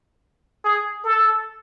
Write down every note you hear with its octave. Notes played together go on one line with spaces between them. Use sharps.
G#4
A4